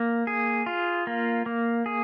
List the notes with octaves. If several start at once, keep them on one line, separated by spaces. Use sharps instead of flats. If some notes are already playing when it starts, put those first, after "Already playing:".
Already playing: A#3
G#4
F4
A#3
A#3
G#4